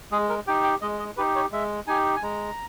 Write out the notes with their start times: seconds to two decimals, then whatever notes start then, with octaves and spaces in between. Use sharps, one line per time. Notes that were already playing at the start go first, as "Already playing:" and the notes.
0.12 G#3 G#4
0.29 A#4
0.47 D#4 G4 G5
0.64 G5
0.82 G#3 D#5
0.99 D#5
1.17 D#4 G4 B4
1.36 C#5
1.52 G#3 E5
1.87 D#4 G4 G#5
2.16 G#5
2.22 G#3 A#5